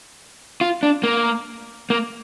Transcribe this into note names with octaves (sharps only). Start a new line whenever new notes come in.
F4
D4
A#3
A#3